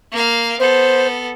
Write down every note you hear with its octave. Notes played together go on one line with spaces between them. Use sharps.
A#3 F5
B3 A4 C5